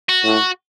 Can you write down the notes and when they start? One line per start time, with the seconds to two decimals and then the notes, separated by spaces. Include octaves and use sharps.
0.09 F#4
0.23 A2